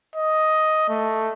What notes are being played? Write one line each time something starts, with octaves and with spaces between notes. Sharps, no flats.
D#5
A3